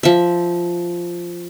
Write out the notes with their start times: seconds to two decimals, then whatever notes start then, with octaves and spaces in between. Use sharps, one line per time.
0.03 F3 E5